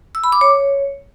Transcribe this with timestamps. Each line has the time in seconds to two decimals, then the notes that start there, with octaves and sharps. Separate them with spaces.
0.15 E6
0.24 B5
0.32 D6
0.41 C#5